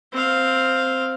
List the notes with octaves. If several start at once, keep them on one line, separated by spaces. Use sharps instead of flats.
C4 F5